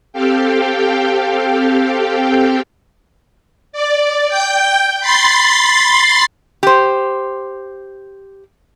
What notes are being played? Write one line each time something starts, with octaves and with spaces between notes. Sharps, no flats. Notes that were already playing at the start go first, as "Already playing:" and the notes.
C4 G4 A4 F5 G5
D5
G5 G6
B5 C6 A6 C7
G4 C5